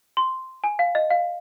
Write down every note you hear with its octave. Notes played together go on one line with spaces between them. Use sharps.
C6
G#5
F5
D#5
F5